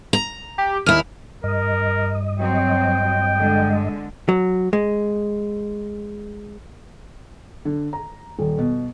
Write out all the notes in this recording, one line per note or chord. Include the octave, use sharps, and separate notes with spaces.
A#5
G4
D#2 E4 F6
G2 A#4 D#5
F#3 C4 G5
D3 G#3
F#3
G#3
D3
A#5
D#1
B2